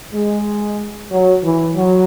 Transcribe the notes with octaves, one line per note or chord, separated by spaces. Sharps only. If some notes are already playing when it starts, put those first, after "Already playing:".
G#3
F#3
E3
F#3